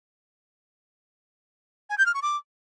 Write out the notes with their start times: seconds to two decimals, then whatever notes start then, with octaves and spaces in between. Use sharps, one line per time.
1.90 G#5
1.98 G6
2.06 F6
2.14 C#6
2.22 D6